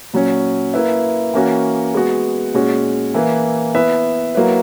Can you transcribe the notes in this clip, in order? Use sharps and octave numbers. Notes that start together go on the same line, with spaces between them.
A#2 F#3 C#4
A#3 E4 B4 E5
E3 A#3 C#4 F#4
G#3 B3 F#4
A#2 G#3 C#4 F#4
E3 A#3 E4 B4
B3 E4 B4 E5
F#3 A#3 E4 B4